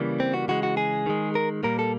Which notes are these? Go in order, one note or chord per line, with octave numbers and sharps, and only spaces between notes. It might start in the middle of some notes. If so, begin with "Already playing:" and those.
Already playing: C#3 E3 G3 A#3
C4
F#4
C#3 E3 G#3 F#4
F#4
G#4
D#3 G#3
A#4
A#2 G3 A#3 A#4
A4